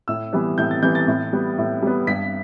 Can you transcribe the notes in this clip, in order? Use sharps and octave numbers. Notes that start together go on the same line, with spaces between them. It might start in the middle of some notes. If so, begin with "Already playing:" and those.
A2 E6
E3 G3 B3
A2 G6
A6
E3 G3 B3 G6
A6
A2
G3 B3
A2
G3 B3
G2 B6